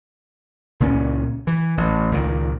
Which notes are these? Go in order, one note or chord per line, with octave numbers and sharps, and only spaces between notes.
C#2 A#2 G3 C#4
E3
A1
C#2 A#2 D#3